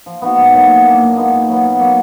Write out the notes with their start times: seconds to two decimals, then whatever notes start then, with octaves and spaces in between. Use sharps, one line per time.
0.06 F3
0.22 B3 D#4 F#4
0.38 G#2
0.54 F#3 A#3
0.69 B2
0.86 A#3 D4
1.01 A#2
1.17 G#3 B3 D#4
1.32 A#2
1.48 F#3 B3
1.64 B2
1.79 F#3 A#3